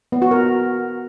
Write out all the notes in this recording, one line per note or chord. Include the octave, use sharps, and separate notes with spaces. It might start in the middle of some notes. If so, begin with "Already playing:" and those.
B3
F#4
A#4